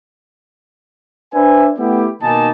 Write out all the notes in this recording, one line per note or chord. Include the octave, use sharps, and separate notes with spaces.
D4 B4 C5 E5 G#5
A3 B3 E4 G4
B2 D#3 A#3 D#4 G#5 A5